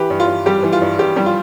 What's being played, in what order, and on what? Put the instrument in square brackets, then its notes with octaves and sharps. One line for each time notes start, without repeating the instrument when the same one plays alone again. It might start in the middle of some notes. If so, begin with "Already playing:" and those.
Already playing: [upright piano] E3 G4 B4
G2
F4
G2
G3 G4
E3
F4
G2
G2 G4
G3
F4